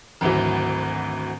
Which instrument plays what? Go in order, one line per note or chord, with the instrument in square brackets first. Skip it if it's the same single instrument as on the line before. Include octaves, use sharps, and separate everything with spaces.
[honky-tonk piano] G#1 D2 E3 F#3